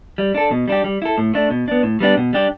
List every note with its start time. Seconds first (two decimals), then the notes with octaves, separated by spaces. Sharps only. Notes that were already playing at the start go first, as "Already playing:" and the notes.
0.18 G3
0.35 D4 A4
0.51 B2
0.68 G3 D4 G4
0.84 G3
1.02 E4 A4
1.18 A2
1.34 A3 D4
1.51 B2
1.68 B3 D4
1.83 A2
2.00 G3 B3 D4 G4
2.17 B2
2.33 G3 D4 G4